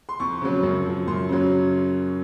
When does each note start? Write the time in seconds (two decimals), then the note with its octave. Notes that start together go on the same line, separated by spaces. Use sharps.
0.09 C6
0.20 F2 C#6
0.41 C#3 F#3
0.63 F#2
0.86 F3
1.07 F#2 C6
1.29 C#3 F#3